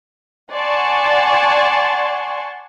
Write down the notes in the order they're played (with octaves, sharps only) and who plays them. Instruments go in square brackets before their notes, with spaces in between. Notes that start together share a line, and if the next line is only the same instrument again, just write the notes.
[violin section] D5 F#5 G#5 A5 C6 C#6